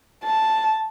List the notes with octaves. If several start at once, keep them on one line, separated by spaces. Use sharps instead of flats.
A5